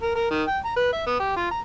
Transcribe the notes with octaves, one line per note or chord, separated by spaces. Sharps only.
A#4
A#4
D#3
G5
A#5
B4
E5
B3
G4
F4
A#5